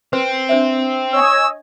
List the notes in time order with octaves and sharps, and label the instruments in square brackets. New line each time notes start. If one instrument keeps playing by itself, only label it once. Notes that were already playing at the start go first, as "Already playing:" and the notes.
[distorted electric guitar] C4 [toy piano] B4 C5 C6
[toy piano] D4 C5 E5
[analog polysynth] C#5 D#5 G#5 [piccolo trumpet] E6